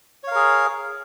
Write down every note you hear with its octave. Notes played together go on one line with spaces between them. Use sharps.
G#4 A#4 C#5 F5